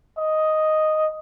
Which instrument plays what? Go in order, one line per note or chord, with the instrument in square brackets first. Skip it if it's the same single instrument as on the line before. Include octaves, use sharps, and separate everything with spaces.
[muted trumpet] D#5